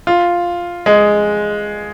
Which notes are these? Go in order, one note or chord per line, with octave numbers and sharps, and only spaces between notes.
F4
G#3